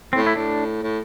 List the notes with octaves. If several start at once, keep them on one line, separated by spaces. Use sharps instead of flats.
A2 C4
E4
A2 D4
A2